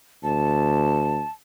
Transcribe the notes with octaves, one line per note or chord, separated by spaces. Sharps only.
D2 A5